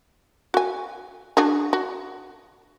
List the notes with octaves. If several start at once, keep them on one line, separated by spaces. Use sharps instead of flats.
F#4 G#5
D4 F#4 G#4
F#4